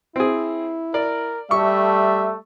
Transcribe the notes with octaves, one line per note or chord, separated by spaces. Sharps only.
C4 E4 G#4
A#4 D5
G3 A3 E5 C#6